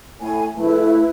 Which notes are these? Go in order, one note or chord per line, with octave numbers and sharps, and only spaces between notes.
A2 G#5
A#1 A3 E4 B4